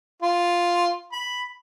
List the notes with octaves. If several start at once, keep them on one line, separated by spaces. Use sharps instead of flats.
F4
B5